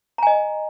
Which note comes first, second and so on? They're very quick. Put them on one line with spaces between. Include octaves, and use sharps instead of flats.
A#5 G#5 D#5